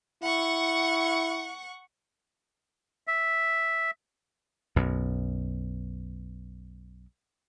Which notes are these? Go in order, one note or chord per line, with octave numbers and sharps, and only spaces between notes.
E4 F#5 C#6
E5
B1 F#2